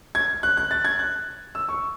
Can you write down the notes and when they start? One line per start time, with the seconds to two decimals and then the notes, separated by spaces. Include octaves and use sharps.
0.15 G#6
0.43 F#6
0.57 F#6
0.71 A6
0.85 G#6
0.99 F#6
1.55 E6
1.69 C#6